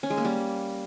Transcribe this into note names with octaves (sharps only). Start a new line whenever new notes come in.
C#4
G#3
A#3
G3